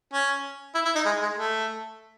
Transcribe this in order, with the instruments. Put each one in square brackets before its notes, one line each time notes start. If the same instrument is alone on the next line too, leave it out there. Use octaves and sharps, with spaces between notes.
[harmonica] C#4
E4
E4
D#4
G#3
G#3
A3